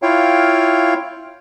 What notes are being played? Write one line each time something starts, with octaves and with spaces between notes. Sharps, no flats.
E4 F4 C#5 F5 G5